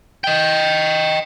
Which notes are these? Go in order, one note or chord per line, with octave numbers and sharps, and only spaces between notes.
D#5 G5